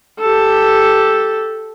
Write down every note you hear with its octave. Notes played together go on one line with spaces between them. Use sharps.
G4 A4